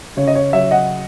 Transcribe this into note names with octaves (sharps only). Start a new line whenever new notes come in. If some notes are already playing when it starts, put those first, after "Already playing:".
C#3 C#5
D#5
C#5
F#3 C#5 E5
D#5 F#5